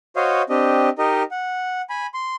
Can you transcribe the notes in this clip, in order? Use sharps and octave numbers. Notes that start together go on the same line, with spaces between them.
F#4 C5 C#5 D#5 F5
C4 D4 G4 D#5
D#4 G4 A#4 D#5
F#5
G#5 B5
C6